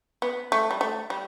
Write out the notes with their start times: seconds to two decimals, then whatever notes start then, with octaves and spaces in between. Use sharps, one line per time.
0.22 B3
0.52 A3
0.71 G3
0.81 A3
1.10 G3